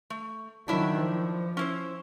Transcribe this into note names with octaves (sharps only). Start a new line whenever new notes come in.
A3
D#3 F#3 D4 E4 E5
F3
C#4 E4 C5